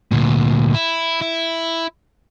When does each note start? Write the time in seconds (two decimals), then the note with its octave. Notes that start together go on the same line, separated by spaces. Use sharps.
0.11 D2 A#2
0.74 E4
1.22 E4